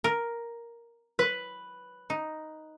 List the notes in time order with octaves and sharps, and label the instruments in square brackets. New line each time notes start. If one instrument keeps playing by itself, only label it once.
[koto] A#4
[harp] B4
[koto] D#4